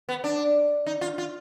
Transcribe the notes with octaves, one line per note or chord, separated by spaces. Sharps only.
B3
D4
D#4
F4
F4